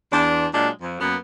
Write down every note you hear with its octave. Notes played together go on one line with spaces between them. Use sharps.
E2 D4
A#2 F#3 G#3 D4
F2
F#2 A#3 B3